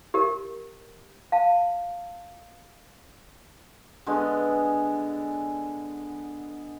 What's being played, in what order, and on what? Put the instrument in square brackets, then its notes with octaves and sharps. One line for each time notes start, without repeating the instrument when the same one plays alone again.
[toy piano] G4 A#4
F5 A5
[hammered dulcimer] D3 G#3 B3